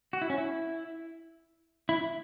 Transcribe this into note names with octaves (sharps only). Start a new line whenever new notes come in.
F#4
E4
C#4
E4
E4